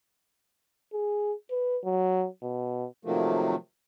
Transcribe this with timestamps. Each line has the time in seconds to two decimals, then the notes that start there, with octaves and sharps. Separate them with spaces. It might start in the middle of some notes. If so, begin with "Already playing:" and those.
0.93 G#4
1.51 B4
1.84 F#3
2.43 B2
3.05 C3 D#3 F3 F#3 A3 A#3